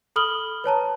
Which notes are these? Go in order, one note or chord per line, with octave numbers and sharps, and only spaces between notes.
A4 B5 D#6 F6 F#7 G7
B4 C#5 A5 A#5